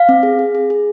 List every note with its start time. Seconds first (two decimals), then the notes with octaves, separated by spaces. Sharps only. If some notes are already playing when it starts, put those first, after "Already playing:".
Already playing: F5
0.09 C4
0.23 G#4
0.39 G#4
0.55 G#4
0.70 G#4